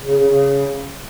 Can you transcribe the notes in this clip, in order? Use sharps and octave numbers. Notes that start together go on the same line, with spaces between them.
C#3
C#3
C#3